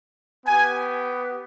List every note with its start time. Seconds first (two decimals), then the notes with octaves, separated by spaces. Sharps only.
0.46 B3 G4 G#5